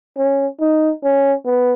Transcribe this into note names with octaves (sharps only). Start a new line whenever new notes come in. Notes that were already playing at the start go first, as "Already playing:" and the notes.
C#4
D#4
C#4
B3